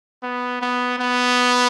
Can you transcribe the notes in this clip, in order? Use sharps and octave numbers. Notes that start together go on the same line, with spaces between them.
B3
B3
B3